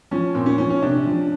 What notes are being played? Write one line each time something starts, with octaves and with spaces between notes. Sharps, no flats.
F3 C#4
A#2 C4
C#4
F3 C#4
C#4
C3 D4
F3